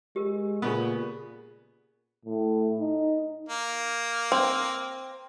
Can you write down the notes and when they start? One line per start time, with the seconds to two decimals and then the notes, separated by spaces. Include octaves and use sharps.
0.16 G#3 G4 A#4
0.62 A#2 C#3 B3
2.25 A2
2.80 D#4
3.49 A#3
4.32 C4